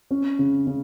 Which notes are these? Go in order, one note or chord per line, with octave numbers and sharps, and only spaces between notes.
C#4
C#3
C#3